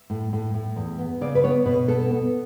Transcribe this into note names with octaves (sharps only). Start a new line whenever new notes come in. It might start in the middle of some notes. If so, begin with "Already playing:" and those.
Already playing: E5
A2
A2
A2
E2
B3
C#3 D5
B4
B3 C#5
B2 B4
B3 A4
B3